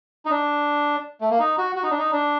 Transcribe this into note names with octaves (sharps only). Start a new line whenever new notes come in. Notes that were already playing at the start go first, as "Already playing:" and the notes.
D#4
D4
A3
A#3
D#4
F#4
F#4
D#4
D4
D#4
D4